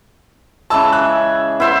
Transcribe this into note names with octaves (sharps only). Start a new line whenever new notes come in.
C#3 E3 G#3 A5 E6
G#5 E6 F#6
B3 E4 C5 E5